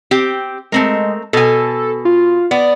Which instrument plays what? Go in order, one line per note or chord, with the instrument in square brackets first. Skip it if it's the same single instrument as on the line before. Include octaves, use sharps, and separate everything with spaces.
[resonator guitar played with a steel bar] C4 G4
[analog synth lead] G#3 [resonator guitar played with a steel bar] A3 C4 A#4
[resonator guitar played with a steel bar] B2 G#5 [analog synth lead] A4
[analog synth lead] F4
[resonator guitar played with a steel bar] B3 [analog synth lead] D5